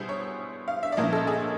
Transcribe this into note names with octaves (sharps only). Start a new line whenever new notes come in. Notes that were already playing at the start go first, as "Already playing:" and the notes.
Already playing: B2 G3 B3 E4 G#4 C5
C#5
F5
E5
D5
A#2 F3 A#3 C#4 E4 D#5
A4
G#4